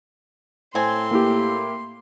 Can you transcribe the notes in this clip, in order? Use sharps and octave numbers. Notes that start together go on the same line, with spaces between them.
A2 C4 G#5 C6
A#3 E4 G4